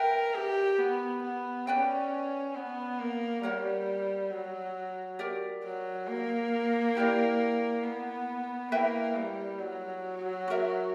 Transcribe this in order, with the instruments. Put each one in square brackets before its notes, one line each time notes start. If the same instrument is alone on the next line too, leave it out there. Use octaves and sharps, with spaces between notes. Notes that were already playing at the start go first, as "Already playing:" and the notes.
Already playing: [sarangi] A#4 [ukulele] B4 E5 G5
[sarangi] G4
B3
B3
[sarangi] C#4 [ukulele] B4 D5 G5
[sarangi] B3
A#3
[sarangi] G3 [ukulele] A#4 C#5 F#5
[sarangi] F#3
[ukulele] G4 A#4 D5
[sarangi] F#3
A#3
[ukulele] E4 G4 A#4 D5
[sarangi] B3
[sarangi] A#3 [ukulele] E4 B4 E5 G5
[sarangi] G3
F#3
[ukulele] F#4 A#4 E5